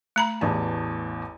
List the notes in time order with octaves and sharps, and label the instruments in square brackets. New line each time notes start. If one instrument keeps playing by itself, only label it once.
[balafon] A3 A#5 B5
[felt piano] A1 E2 A5